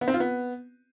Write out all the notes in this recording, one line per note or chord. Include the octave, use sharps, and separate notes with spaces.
B3
C4
F4
B3